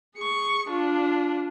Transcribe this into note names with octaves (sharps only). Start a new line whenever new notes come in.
G#4 C#6
D4 F4